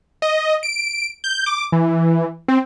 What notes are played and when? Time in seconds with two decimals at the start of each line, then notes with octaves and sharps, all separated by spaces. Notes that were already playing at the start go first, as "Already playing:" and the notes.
0.22 D#5
0.63 D7
1.24 G6
1.46 D6
1.72 E3
2.48 C4